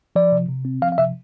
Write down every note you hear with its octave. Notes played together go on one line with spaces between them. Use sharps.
F3 D5
C3
C3
C4
F3 F5
F5
C3 E5